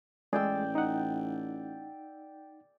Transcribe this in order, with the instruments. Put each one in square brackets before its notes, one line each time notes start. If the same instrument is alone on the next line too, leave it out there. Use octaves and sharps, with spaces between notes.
[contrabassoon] A1 [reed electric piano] G#3 G#4 [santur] D5 G5 E6
[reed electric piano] D#4 F#5